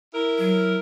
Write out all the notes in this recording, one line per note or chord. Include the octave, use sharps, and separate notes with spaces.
E4 A#4
F#3